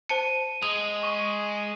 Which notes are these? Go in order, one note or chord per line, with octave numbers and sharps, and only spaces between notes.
C5 A5 C#7 D#7
G#3 D#6 F7
C#6